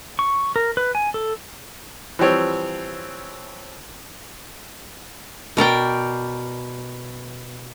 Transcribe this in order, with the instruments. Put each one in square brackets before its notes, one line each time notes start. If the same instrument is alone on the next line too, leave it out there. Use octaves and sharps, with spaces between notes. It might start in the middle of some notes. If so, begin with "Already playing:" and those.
[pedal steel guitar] C#6
A#4
B4
G#5
A4
[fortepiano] E3 F3 G3 C4 C#5
[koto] B2 A#4 D5 G5